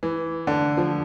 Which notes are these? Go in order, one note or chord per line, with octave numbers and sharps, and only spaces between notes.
E3
D3
F3